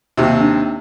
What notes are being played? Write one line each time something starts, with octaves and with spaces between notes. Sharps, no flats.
D#2 C3
D4